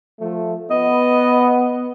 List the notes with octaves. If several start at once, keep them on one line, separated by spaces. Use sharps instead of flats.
F3 A3
B3 D#5